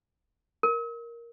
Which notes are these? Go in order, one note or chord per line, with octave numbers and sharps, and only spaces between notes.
A#4